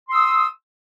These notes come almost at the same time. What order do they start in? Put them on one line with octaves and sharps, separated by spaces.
C6 E6 D#6